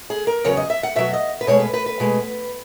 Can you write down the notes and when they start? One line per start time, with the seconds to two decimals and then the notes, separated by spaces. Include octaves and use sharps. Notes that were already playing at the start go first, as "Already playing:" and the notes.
0.10 G#4
0.27 A#4
0.44 E2 C#3 F#3 C#5
0.57 D#5
0.70 E5
0.83 F#5
0.96 B2 F#3 E5
1.13 D#5
1.41 B4
1.47 B2 G#3 C#5
1.60 B4
1.74 B4
1.86 B4
2.00 B2 G#3